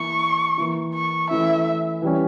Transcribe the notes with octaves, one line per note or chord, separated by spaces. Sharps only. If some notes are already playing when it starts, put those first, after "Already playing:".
Already playing: E3 A#3 E4 C#6
E3 A#3 E4
C#6
E3 A3 C#4 E4 E5
E3 G3 C#4